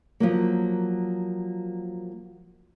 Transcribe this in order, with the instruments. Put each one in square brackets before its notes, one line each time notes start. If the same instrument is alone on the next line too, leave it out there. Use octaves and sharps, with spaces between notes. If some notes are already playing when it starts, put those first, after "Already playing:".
[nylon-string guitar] F3 F#3 A#3